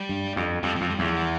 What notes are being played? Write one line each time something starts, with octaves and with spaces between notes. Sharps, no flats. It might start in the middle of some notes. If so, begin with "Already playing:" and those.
Already playing: G3
G2
F2
F2 G3
F2 F3
G3
E2
F3
E3